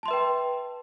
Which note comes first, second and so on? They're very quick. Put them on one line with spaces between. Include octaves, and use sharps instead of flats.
A5 C6 E5 B4 G5